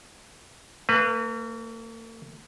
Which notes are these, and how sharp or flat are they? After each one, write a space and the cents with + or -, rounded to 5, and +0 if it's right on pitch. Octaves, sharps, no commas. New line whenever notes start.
A#3 -45 B4 +0